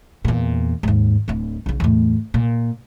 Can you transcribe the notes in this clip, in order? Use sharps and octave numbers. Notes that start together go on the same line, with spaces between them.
E2 A#2
D#2 G#2
D1 E4
B1 C#3
E2 A2
A#2